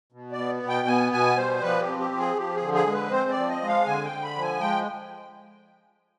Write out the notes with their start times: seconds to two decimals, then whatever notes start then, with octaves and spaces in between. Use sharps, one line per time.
0.12 B2
0.32 D5
0.38 B3
0.63 B2
0.69 G5
0.87 B3 G#5
1.12 B2 G#5
1.37 G3 C5
1.62 F3 B4
1.81 G4
1.87 C4
2.00 G4
2.11 F3
2.18 G#4
2.36 F3 G4
2.55 G#4
2.61 D3
2.74 G#4
2.86 G#3
2.93 B4
3.11 C4 C5
3.30 D5
3.36 F3
3.49 D#5
3.61 G#3
3.67 F5
3.86 D3 G#5
4.04 G5
4.12 D3
4.23 B5
4.36 F3
4.42 G#5
4.60 G#3 G5